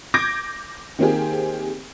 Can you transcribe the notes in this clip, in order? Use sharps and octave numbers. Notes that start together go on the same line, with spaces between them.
D6 G6 G#6 A#6 D7
D#3 A#3 C4 G4 G#4